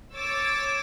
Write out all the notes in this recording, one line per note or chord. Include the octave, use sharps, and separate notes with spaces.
C#5 D6 E6 A6